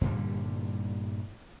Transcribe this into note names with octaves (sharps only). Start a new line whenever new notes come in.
G2 A#2 D3 G3